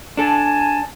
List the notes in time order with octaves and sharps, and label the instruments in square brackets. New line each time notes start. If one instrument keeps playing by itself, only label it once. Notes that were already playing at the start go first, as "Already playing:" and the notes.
[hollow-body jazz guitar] D4 A4 [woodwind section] G#5 A5